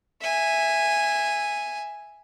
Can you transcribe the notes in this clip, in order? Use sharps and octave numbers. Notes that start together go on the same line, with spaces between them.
E5 G#5